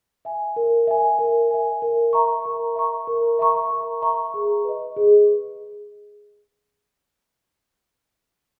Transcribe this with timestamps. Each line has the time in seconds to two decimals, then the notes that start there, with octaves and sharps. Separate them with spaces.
0.25 E5 G#5
0.56 A#4
0.87 E5 G#5
1.19 A#4
1.51 E5 G#5
1.82 A#4
2.13 E5 A#5 C#6
2.45 A#4
2.76 E5 A#5 C#6
3.07 A#4
3.39 E5 A#5 C#6
3.71 A#4
4.02 E5 A#5 C#6
4.34 G#4
4.64 B4 D#5
4.96 G#4